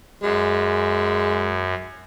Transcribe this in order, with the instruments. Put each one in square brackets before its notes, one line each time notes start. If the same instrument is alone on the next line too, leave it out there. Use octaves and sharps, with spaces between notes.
[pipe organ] F#2 [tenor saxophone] G#3